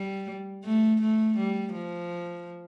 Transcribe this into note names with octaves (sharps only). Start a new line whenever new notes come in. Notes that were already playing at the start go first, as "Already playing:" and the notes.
Already playing: G3
A3
A3
G3
F3